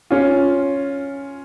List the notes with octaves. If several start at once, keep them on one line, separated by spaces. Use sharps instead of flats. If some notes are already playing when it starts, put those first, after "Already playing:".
C#4 F4